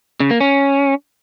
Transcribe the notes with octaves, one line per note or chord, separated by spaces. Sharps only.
C#3
A#3
C#4